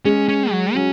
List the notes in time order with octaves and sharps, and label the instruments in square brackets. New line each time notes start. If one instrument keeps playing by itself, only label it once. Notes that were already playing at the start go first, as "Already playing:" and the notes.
[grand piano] G#3 [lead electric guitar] C#4
[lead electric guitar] C#4
F#3
[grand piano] F#3 [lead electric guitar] C#4